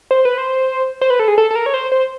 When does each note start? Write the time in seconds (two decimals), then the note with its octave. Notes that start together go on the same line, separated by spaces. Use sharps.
0.11 C5
0.25 B4
0.38 C5
1.01 C5
1.10 B4
1.19 A4
1.28 G#4
1.38 A4
1.51 A4
1.55 A#4
1.66 C#5
1.74 C5
1.92 C5